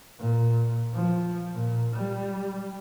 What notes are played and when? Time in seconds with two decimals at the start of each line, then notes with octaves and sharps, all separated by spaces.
0.20 A#2
0.95 F3
1.55 A#2
1.96 G3